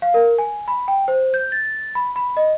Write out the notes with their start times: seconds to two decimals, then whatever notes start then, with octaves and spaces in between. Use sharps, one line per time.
0.02 F5
0.14 A#4
0.38 G#5
0.68 B5
0.88 G5
1.08 C5
1.34 G6
1.52 A6
1.95 B5
2.16 B5
2.37 D#5